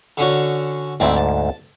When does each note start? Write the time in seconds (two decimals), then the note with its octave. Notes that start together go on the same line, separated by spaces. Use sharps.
0.18 D3 C#4 F#4
1.00 D2 G#2 C4 E4
1.17 A5